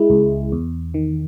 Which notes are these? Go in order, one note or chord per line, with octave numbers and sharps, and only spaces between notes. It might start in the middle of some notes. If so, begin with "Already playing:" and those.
Already playing: G#3 E4 G#4
C#2
E2
D#3